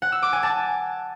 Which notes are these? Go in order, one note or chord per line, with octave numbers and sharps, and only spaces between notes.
F#5
E6
D6
G#5
A5